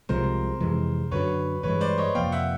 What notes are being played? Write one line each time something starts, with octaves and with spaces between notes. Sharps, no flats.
C2 C3 F3 G#3 A#4 C5
F2 C3 E3 G#3
F#2 D3 F#3 B4 C#5
G2 E3 G#3 B4 C#5
C5 D5
C#5 D#5
F2 C3 F3 A#3 F5 G5
E5 F#5